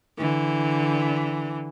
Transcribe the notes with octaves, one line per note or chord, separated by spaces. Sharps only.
D3 E3